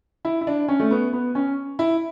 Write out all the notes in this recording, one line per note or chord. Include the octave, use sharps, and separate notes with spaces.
E4
E4
D4
C#4
A3
B3
B3
C#4
E4